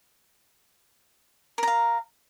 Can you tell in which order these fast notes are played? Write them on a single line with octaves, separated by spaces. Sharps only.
A#4 A#5 F5